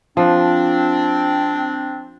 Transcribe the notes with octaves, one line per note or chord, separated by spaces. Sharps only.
F3 C4 D4